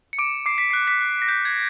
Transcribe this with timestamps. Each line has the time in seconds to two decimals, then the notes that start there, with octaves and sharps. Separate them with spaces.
0.13 C#7
0.18 D6 D7
0.46 D6 C7
0.58 B6
0.71 C7
0.73 F#6
0.88 B6
1.01 F#6
1.22 A#6
1.28 G6 B6
1.45 G#6